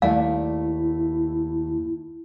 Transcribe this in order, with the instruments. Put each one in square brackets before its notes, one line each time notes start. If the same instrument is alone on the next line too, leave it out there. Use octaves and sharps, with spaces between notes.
[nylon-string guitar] D#2 A3 D5 [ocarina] E4 [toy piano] F5